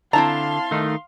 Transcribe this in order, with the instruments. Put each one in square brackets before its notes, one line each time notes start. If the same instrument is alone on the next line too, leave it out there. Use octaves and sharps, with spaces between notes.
[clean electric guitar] D3 [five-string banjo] C4 E4 A#5 [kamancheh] F5 C6 [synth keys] A5
[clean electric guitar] D#3 A3 D#4